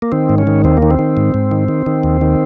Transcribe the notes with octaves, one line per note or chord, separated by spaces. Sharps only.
A#3
D#3 C4
G#2
C#4
D#3
D#2 C4
A#3
D#3
C4
D#3
G#2
G#2
D#3
D#3
D#3
D#2
D#3